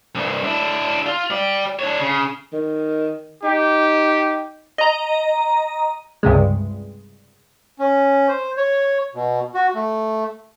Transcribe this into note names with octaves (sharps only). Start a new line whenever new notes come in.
C2 G2
D4 E4
F4
G4 D5
D4 C#5
C#3
D#3
D#4 G4
D#5 A#5
C#2 G2 C3 G#3
C#4
C5
C#5
B2
F#4
A3